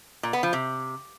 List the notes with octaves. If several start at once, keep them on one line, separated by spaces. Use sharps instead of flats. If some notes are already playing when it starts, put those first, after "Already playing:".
A#2
B3
F3
C3